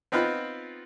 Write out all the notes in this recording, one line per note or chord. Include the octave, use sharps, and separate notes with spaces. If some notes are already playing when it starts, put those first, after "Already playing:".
B3 C4 D#4 F4 B4